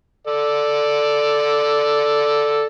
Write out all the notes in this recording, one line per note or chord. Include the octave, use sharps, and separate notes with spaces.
A4 D5